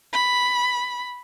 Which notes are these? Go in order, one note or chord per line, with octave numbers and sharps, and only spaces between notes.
B5